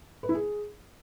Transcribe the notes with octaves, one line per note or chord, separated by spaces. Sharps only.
B4
E4
G#4